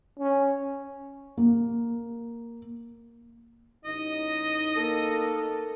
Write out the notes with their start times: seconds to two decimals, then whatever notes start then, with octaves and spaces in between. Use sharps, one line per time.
0.19 C#4
1.37 A#3
3.85 A1 D#4 D#5
4.75 A#3 A4